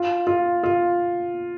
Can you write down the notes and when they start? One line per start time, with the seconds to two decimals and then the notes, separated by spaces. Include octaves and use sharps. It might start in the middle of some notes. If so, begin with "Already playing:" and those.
Already playing: F4
0.27 F4
0.63 F4